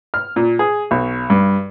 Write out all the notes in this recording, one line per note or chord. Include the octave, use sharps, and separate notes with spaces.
F6
A#2
G#4
B1
G2